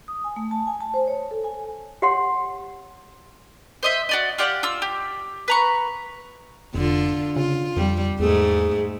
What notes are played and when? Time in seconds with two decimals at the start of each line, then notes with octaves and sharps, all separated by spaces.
0.08 D#6
0.24 G#5
0.36 A3
0.51 A5
0.67 G#5
0.81 A5
0.94 C5
1.08 C#5
1.31 A4
1.44 G#5
2.02 G4 C#5 F#5 C6
3.83 C5 D#5 E5
4.09 F#4 D5 D#5
4.38 F4 G4 D5 F#5
4.63 F4 E6
4.82 G4
5.48 B4 A#5 C#6
6.74 F1 D3 F4
7.36 C#3 F4
7.77 F2 G3
8.20 E2 G#2 A3 G#4